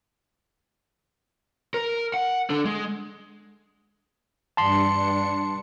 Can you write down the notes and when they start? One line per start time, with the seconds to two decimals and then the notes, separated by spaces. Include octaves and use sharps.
1.74 A#4
2.14 F#5
2.50 D4 A4
2.65 G#3
4.57 G2 D4 A5 C6 C#7